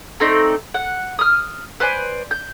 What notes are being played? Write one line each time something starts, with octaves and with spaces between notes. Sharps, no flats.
A3 C4 D#4 D5
F#5
D#6 F6
B4 C5 D5 G#5
G6